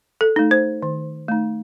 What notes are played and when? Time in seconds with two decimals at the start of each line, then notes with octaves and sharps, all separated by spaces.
0.21 A4
0.36 A3 D#4
0.51 C5
0.82 D#3
1.28 A3 D#4